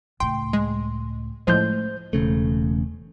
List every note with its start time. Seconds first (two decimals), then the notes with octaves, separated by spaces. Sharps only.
0.20 C#2 A2 G5 C6
0.53 G#3
1.47 A2 F3 G#3 A3 C#4 C5 G6
2.13 E1 C#3 A3